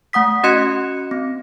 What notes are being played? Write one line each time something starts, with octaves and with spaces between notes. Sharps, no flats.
A3 F#5 D#6 B6
C#4 F#4 D#5 C6 F#6 C#7
C4